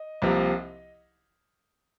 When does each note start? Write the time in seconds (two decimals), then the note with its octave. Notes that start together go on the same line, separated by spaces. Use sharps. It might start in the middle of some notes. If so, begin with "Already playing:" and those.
Already playing: D#5
0.22 C2 C3 F3 A#3